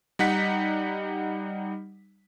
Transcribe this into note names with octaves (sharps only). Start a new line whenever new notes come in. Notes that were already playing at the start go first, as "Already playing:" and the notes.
G3 D#4 F#5 B6